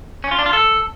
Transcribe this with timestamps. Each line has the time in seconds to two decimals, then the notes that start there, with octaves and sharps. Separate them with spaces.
0.24 C#4
0.31 F4
0.39 D4
0.46 F4
0.53 A4